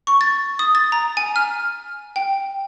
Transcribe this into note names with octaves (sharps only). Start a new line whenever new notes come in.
C#6
A6
D#6
A6
A#5
G#5
F6
G5